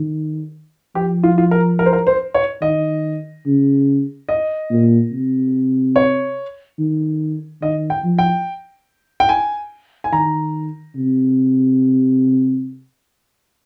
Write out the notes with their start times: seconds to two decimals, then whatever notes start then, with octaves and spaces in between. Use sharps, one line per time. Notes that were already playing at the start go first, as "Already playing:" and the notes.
Already playing: D#3
0.95 F3 G4
1.23 F4
1.38 F4
1.51 A#4
1.79 A#4
1.86 C5
1.93 A#4
2.07 C5
2.34 C#5
2.62 D#3 D#5
3.46 C#3
4.29 D#5
4.70 A#2
5.13 C3
5.96 C#5
6.79 D#3
7.62 D#3 D#5
7.90 G5
8.04 F3
8.19 G5
9.20 G5
9.29 G#5
10.04 G#5
10.12 D#3 A#5
10.96 C3